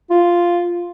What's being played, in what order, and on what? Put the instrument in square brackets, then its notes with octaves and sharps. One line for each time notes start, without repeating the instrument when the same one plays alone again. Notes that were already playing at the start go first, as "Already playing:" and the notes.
[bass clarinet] F4